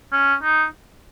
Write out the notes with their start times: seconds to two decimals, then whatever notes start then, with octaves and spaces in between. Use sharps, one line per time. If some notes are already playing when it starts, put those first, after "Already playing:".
0.13 C#4
0.43 D#4